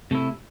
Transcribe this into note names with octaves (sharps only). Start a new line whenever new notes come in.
C3 A3 E4